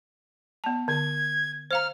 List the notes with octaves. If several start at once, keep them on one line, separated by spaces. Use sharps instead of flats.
B3 A5
D3 G#6
C5 F5 A#5 F6